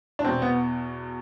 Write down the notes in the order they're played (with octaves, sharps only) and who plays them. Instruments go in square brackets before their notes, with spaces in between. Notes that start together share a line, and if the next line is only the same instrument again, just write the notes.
[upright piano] D4
E2 B2 C4
B3